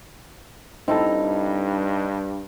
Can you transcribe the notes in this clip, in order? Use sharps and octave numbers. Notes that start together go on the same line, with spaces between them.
G2 C4 D#4 E4 A4